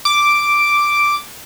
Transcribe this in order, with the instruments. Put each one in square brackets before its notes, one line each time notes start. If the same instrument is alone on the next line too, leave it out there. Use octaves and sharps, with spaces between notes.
[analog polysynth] D6